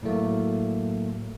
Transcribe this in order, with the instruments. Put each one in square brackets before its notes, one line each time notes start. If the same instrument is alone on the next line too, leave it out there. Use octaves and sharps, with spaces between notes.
[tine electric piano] A2 F#3 A3 A#3